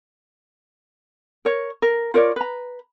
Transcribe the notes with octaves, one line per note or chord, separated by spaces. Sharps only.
A#4 C#5
A#4
F4 A#4 C#5 D5
B4 A#5